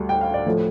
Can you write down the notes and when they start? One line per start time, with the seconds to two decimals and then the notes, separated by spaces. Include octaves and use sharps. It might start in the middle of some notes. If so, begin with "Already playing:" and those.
Already playing: D2 D3 G3
0.09 G5
0.21 F5
0.34 D5
0.45 A2 F3 A3